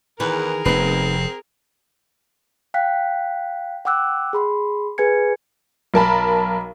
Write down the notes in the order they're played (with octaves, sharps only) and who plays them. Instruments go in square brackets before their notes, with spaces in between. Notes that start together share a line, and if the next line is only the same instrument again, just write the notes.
[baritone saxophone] E2 [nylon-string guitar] D#3 E3 B4 [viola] G#4 A#4
[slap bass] F1 [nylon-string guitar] B3 D#4 B4 [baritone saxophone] C4
[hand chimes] F5 G5 F#6 B6
F#5 G5 D6 E6 F#6
G#4 B5 C6
G#4 B4 G#5 G#6 C#7
[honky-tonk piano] B1 A#4 A5 B5